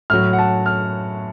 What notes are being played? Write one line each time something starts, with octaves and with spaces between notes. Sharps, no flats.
A2 F#3 F6
F#5
A5
F6